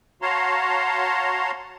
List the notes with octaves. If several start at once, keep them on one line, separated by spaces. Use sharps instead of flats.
F#4 C#5 F5 A5 A#5 C6